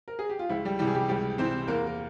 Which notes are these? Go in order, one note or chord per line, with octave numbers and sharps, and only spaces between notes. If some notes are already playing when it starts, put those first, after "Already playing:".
A#4
G#4
G4
F4
C#2 E4
G3 G4
C3 E3 G3 G4
G#4
G3 G4
C#2 G3 G4
C3 E3 C4 C5
E2 A#3 A#4
A#4